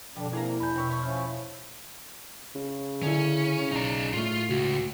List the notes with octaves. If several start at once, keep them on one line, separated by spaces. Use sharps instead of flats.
G2 B2 D3 F3 G3 D4
C3 A#3 D4 E4 G#4 F5 A#5
E2 D4 G#5 B5 G6
B2 C4 D4 C#5 E5
E2 A3 C#5 C6
F3 C#4 E4 F6
C#3
D3 C#4 E4
B1 D#4 D5 A#5
A2 A3 F4
C#2 F#4